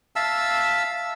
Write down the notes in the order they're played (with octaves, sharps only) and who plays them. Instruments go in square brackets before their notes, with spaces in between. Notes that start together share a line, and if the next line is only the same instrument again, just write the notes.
[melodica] E5 F5 A5 E6